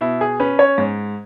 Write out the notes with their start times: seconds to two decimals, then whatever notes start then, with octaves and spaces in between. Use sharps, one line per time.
0.01 B2 E4
0.21 G#4
0.40 C#4 B4
0.59 C#5
0.78 G#2